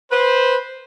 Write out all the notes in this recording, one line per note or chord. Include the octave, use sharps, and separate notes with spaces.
B4 C5